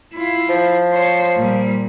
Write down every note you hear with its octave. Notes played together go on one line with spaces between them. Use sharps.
E4 F4
F3
C5 C#5
A#2 G3